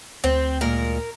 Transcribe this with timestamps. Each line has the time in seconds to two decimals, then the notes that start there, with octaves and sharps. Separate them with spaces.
0.24 D2 C4
0.61 A#2 G#3 A#4